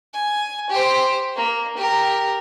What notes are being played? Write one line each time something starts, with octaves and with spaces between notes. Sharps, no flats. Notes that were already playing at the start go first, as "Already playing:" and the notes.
G#5
G4 C5
A#3
G4 A#4